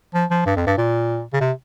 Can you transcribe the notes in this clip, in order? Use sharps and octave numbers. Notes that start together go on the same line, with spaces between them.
F3
F3
G2
F2
G2
A#2
C#3
C3